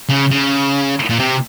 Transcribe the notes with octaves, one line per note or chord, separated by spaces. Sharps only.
C#3
C#3
A#2
C3